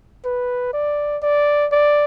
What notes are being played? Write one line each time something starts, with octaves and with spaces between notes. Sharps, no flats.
B4
D5
D5
D5